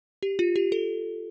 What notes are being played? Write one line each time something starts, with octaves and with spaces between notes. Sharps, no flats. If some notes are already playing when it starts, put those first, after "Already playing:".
G4
F4
G4
A4